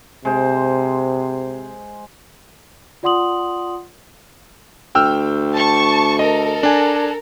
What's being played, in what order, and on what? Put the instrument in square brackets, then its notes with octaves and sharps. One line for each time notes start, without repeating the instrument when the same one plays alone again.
[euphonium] C3 [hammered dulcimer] G#3 C5
[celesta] F4 D5 F#5 C6 D#6 F#7
[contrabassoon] D2 [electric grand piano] G5 E6 F6
[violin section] A5 C#6
[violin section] A4 A#4 [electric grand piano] D#5
[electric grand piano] D4 G#5